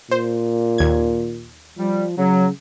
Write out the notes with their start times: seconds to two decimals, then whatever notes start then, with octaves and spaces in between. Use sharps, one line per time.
0.11 A#2 C5
0.78 D#2 G#6
1.78 F3 G3
2.18 C#3 F#3